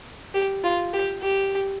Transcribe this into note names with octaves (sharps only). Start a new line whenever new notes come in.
G4
F4
G4
G4